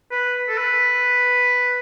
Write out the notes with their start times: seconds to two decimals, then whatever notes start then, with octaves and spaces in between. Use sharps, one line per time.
0.12 B4
0.49 A4
0.58 B4